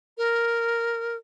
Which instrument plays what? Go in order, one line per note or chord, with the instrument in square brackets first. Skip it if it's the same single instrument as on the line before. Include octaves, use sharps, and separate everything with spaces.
[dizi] A#4